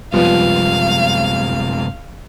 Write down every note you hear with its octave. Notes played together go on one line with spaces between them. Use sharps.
F#2 C3 F3 G3 G#3 B3 F4 F5